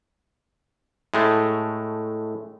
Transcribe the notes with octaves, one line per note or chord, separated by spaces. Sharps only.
A2 G#3 A3